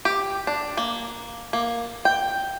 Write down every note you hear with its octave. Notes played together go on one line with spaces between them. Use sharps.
G4
D4
A#3
A#3
G5